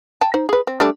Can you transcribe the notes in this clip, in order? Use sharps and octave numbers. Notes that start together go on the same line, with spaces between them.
G5 A5
D#4 C5
G#4 B4
C4
G3 A3 D4